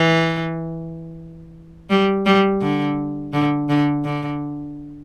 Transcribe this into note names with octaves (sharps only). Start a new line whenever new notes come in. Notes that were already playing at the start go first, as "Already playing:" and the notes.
Already playing: E3
G3
G3
D3
D3
D3
D3